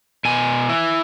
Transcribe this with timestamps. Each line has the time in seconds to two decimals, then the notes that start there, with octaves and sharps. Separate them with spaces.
0.25 B2 G#5
0.69 E4